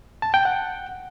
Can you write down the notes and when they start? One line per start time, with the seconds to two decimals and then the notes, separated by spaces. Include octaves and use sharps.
0.22 A5
0.34 G5
0.45 F#5